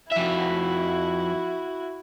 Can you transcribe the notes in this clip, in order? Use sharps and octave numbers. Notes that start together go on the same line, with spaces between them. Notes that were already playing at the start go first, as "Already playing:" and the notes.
F2 E4 F#4 E5